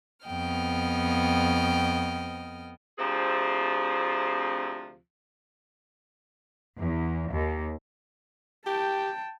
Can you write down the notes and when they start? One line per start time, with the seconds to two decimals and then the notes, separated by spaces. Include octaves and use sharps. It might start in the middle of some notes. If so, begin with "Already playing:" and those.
0.26 F2 B3 D#5 G5 F6
2.99 D2 C3 F3 C4 G#4
6.78 E2
7.30 D#2
8.66 G4 G5 A5